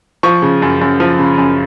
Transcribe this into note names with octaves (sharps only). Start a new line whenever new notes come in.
F3 C#6
C#3
F#2
F#2
F3
C#3
F#2